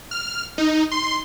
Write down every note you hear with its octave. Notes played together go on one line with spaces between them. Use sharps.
F6
D#4
C6